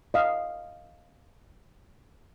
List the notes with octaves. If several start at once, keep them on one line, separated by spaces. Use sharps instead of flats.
D#5 F5